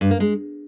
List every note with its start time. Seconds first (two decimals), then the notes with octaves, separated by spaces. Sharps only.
0.01 G2
0.11 A#3
0.20 G#3